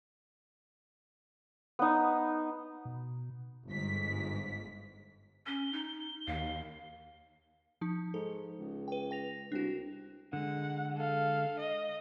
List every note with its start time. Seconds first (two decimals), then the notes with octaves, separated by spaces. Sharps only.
1.79 B3 D#4
2.85 B2
3.68 G1 G#2 B6
5.46 C#4 G7
5.73 D#4
6.27 D#2 F5
7.81 F3 D#4
8.14 G#2 A4
8.59 C#2
8.88 B4 G5
9.11 G5 A#6 F7
9.52 C2 D4 F#4
10.33 D3 G#3 F#5
10.97 A4 F5
11.60 D#5